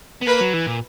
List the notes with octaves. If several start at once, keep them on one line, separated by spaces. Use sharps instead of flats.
B3
A#3 B4
F#3
E3
A#2